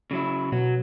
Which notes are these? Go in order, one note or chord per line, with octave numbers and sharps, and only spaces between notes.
C#3 F#3 E4
B2 F#3